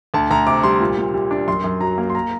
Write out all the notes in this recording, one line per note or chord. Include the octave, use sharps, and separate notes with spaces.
D2 A5
D2 A#5
C3 D6
G3 C6
A#2
A#2
G3
D4
F#2 C6
F#2
F#3 A#5
A#3
C6
A#5